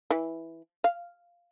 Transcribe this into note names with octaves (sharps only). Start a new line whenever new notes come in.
E3
F5